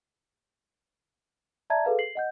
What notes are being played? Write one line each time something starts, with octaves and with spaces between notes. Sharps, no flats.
D5 E5 A5 A#5 G#6
G#4 A4 B4 F5
C7 F#7
D#5 F#5 G6